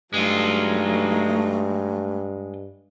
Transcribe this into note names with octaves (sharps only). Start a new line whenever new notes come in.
G2 F#3 G#3 A3 D#4 F4